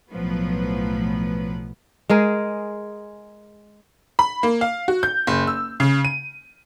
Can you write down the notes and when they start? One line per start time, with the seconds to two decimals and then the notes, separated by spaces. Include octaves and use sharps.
0.12 B1 A2 F3 F#3 B3 B4
2.09 G#3 G#4 A#4
4.19 B5
4.43 A#3
4.61 F5
4.88 F#4
5.03 G6
5.27 F#1
5.47 E6
5.80 C#3
6.05 D#7